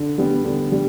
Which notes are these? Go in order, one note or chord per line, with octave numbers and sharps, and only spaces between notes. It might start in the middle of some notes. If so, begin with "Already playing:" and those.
Already playing: D3
G3 B3
D3
G3